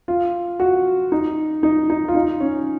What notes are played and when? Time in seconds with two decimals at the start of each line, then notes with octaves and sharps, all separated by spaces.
0.08 F4
0.60 F#4
1.12 D#4
1.63 D#4
1.90 D#4
2.08 F4
2.15 D#4
2.41 C#4